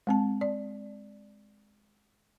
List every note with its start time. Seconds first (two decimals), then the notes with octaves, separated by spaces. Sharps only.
0.07 G#3 C4 A5
0.41 D5